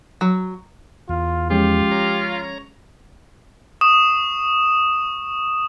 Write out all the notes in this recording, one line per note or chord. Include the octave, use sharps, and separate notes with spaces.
F#3
E2 F4
F3 G#3 C#4 F4 G4
C#5 A#5
C#6 D#6 E7